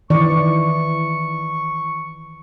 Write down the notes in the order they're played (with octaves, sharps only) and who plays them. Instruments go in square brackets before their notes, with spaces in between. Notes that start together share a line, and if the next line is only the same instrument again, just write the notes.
[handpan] D#3 E3 D5 [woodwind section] C#6